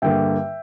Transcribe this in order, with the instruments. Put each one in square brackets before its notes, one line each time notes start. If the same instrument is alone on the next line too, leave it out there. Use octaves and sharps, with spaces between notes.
[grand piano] G2 D3 A#3 E5 G5